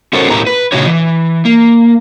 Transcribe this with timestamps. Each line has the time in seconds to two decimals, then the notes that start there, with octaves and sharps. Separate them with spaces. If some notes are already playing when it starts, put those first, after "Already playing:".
0.13 C#4 F#4 A4 A#4 C5 C#5
0.30 A2 C#4 E4 G4 A#4 A#5
0.47 B4
0.72 A#2 C#3 D4 F#4 G4 C#5
0.86 E3
1.45 A#3